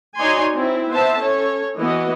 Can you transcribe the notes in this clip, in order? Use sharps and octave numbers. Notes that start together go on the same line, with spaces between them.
D#4 F#4 C#5 D5 G#5 C6
C4 E4
B3 C5 E5 A5
C#4 A4 C#5
E3 B3 E4 F#4 D#5